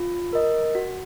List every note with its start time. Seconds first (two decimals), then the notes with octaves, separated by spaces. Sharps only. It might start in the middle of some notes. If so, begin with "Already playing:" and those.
Already playing: F4
0.33 A#4 D#5
0.75 F#4